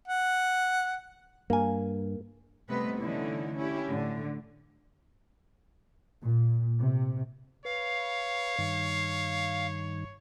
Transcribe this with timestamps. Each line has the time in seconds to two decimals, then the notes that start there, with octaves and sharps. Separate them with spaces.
0.08 F#5
1.50 G2 A#3 G#5
2.69 C3 G3 A3 B3 B4 D#5
3.00 D3 E3 A3 C#4 D#4 E4
3.55 C#4 E4 G4
3.89 A2 D3
6.22 A#2
6.80 C3
7.65 B4 C#5 F5
8.58 G2 D#3